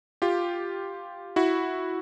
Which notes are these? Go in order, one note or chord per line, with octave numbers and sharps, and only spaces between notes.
F4 G4
E4 F#4